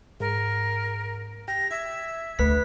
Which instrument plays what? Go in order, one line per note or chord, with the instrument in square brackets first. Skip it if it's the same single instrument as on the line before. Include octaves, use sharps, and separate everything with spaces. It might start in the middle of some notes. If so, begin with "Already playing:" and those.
[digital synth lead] G#2 [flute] A#4
[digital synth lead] G4 [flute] A#6
[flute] E5 [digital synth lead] G#6
[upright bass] D2 [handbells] A3 B4 B6